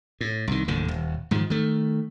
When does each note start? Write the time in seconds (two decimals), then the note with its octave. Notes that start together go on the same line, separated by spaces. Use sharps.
0.21 A2
0.47 C2 D#3
0.68 F#1 D#2 A2 D3
0.88 D#1
1.31 G#2 D#3 F3
1.50 D#3 A3